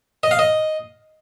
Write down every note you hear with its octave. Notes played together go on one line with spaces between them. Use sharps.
D#5
F5
D#5